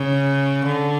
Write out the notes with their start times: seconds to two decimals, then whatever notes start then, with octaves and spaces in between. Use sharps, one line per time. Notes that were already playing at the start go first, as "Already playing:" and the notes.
Already playing: C#3
0.65 D3